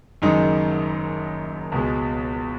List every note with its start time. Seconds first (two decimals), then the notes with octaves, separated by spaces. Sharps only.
0.22 F#1 F#2 D#3 G#3 D#4
1.72 C#2 B2 G#3